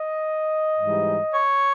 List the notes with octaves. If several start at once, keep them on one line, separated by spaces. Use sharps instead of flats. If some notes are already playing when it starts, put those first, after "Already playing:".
Already playing: D#5
G#2 E3 G3
C#5